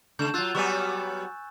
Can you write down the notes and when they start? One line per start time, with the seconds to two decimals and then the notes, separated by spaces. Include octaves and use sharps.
0.19 C#3 A3 G6 E7
0.34 F#3 F4 E6 F#6 A6
0.55 F#3 G3 B3 G#5 C#6